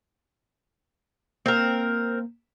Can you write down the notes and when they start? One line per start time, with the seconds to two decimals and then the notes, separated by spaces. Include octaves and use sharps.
1.46 A#3 C4 A#4